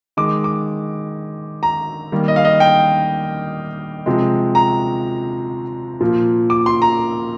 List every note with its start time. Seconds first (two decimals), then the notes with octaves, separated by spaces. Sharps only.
0.17 D#3 G#3 D6
0.44 D6
1.63 A#5
2.12 D#3 G3 A#3
2.28 D#5
2.36 F5
2.45 D#5
2.60 G5
4.06 C3 F3 G#3
4.55 A#5
6.01 A#2 F3 A#3
6.50 D6
6.66 C6
6.82 A#5